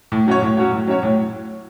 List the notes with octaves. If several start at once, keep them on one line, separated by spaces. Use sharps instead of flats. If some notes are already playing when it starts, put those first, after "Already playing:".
A2
F#3 C#4 F#4 C#5
A2
F#3 C#4 F#4 C#5
A2
F#3 C#4 F#4 C#5
A2